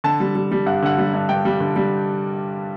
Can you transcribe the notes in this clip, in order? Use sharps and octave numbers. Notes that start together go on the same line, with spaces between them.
D3 A5
G3
G3
G3
G2 F#5
D3 F#5
G3
G2
G2 G5
G3
D3
G3